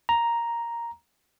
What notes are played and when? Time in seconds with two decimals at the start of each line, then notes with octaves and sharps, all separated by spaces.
0.09 A#5